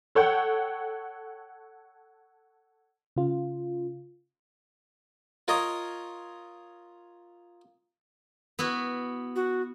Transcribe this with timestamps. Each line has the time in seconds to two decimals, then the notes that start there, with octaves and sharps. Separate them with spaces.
0.15 A4 C#5 F#5 G5 G6
3.16 C#3 F4
5.48 F4 A#4 C#5 D#5
8.59 B3 E4 F#4
9.36 F#4